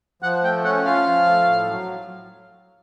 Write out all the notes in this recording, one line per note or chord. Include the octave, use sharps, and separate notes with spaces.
F3 F#5
A3 G5
C#4 F#5
F4 F5
F3
A3
A2
F#3